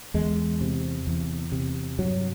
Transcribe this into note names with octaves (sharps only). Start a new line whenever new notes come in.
E2 G#3
C3
E2
C3
G2 F#3